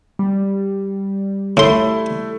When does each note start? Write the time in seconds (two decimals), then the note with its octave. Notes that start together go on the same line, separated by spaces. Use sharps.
0.19 G3
1.57 A2 A3 E4 C6